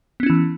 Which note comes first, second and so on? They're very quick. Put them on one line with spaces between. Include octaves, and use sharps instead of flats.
B3 C#4 E4 E3